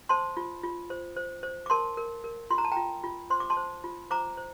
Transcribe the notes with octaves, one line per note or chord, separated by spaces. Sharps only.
C5 A5 C6
F4
F4
C5
C5
C5
D6
A#4 A5 C6
A#4
A#4
F4 C6
A#5
A5
F4 G5 A#5
F4
C5 C6
D6
A5 C6
C5
F4
C5 A#5 D6
C5